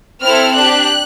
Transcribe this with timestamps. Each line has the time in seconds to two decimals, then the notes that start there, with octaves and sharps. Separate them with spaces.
0.23 C4 E4 A4 F6
0.55 D4 G4 F#6